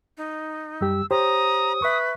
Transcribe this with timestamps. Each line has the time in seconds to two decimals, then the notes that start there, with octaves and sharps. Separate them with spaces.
0.17 D#4
0.81 F#2 G3 G4 E6
1.11 G4 C5 C#5 A#5 D#6
1.82 B4 E5 C#6